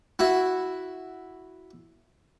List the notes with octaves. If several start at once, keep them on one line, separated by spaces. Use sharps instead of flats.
E4 F#4